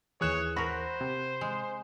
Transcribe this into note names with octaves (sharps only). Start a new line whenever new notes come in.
D#2 E3 G#4 C#5 F#6 E7
F#4 A#4 C5 B5
C3
G#3